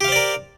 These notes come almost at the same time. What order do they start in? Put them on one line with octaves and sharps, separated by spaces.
G4 F5 C5 D5 A#4